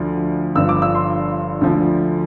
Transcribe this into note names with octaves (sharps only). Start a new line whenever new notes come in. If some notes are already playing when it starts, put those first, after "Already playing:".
Already playing: D2 D3 F3
G1 G2 F3 E6
D6
E6
C6
D2 D3 F3